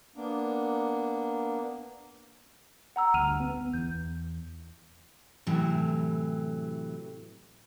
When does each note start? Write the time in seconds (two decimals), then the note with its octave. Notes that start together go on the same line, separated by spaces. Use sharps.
0.16 A#3 B3 D4
2.96 F#5 A#5 E6
3.14 D2 G2 F6 D#7 F7
3.40 B3
3.73 E2 G6
5.47 A2 C3 E3 F#3